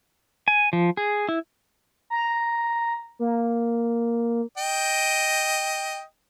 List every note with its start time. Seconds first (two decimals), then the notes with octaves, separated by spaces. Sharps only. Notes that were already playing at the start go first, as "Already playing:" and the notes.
0.48 G#5
0.73 F3
0.97 G#4
1.29 E4
2.10 A#5
3.19 A#3
4.58 D#5 G5